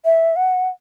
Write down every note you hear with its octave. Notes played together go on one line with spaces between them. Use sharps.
E5
F#5